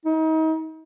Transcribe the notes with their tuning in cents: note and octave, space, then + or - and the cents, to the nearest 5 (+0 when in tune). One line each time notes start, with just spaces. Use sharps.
D#4 +35